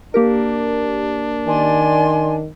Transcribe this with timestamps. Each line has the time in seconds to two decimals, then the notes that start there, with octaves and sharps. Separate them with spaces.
0.14 A#3 D4 G4 A#4
1.47 D#3 D5 G#5 C6